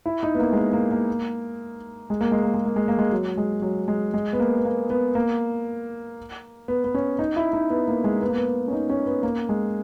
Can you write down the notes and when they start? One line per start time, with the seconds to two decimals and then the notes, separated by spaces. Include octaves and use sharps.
0.06 E4
0.23 D#4
0.35 B3
0.39 A#3
0.53 G#3
0.56 A#3
0.73 A#3
0.91 A#3
2.10 G#3
2.21 A#3
2.32 G#3
2.43 A#3
2.54 G#3
2.66 A#3
2.76 G#3
2.88 A#3
2.99 G#3
3.12 F#3
3.37 G#3
3.62 F#3
3.88 G#3
4.14 G#3
4.33 B3
4.40 A#3
4.59 B3
4.65 A#3
4.90 B3
5.15 A#3
6.68 B3
6.84 B3
6.94 C#4
7.19 D#4
7.36 E4
7.53 D#4
7.70 B3
7.88 A#3
8.04 G#3
8.21 B3
8.29 A#3
8.36 B3
8.68 C#4
8.73 D#4
8.90 C#4
9.06 B3
9.23 A#3
9.49 G#3